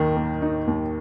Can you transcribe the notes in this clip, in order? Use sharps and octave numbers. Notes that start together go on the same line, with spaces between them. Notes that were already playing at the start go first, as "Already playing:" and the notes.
Already playing: D#2 D#3
A#3
D#4
D#2